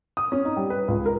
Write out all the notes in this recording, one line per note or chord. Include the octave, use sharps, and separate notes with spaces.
D#6
C#4
D#4
G3
B4
C#2
A#4